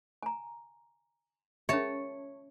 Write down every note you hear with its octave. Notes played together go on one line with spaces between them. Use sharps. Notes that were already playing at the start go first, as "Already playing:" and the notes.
G#5 A#5
C#4 C#5 E5 A5